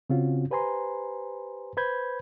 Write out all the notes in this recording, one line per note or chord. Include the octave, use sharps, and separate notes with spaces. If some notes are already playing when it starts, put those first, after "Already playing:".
C#3 C4 C#4 F4 F#4
G4 B4 C5 G#5 A#5 C6
B4 C5 B5 G6 G#6